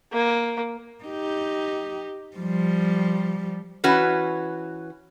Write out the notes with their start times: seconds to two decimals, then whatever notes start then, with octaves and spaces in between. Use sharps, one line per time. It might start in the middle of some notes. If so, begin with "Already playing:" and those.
0.12 A#3
1.04 D#4 G4
2.37 F3 G3
3.84 E3 C#4 F#4 B4